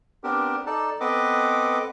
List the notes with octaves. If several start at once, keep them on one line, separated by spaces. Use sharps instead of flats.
B3 C4 D4 G4 A#4
D#4 A4 D5 A5
B3 C4 A4 B4 D#5 D6